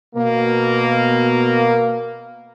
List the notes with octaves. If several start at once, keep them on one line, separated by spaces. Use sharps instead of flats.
B2 A#3